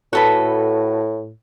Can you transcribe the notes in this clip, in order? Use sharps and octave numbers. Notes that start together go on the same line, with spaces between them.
A2 F#4 A4 B4